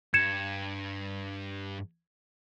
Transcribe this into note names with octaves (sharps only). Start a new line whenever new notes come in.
G2 G#6 C#7 E7